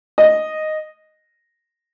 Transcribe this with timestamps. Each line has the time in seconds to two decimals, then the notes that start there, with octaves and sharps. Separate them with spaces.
0.18 D#5